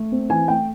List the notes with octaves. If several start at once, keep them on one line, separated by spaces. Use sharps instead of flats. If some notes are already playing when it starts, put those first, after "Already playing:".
Already playing: A3
C4
E3 G#5
A3 G5